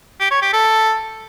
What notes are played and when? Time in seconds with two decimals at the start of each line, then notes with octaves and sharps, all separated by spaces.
0.20 G4
0.31 C#5
0.42 G4
0.53 A4